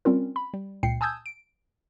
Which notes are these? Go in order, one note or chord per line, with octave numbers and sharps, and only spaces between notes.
G3 C4 C#4 F4 A#4
B5
G3
C#2 A#2 G5 C7 C#7
G#5 A5 D#6 E6 G6 G#6
D7